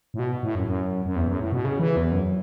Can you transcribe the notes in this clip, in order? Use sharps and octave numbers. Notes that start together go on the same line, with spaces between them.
A2
B2
A2
F#2
F#2
F#2
E2
F#2
A2
B2
C#3
E3
E2
F#2